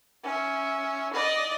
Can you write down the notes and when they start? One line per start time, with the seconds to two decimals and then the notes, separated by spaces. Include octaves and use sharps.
0.24 C#4 E5
1.14 D5 D#5